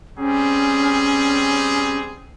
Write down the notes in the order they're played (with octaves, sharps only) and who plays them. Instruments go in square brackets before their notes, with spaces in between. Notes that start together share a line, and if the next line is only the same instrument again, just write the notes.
[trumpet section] G3 C4 G#4 [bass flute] C#4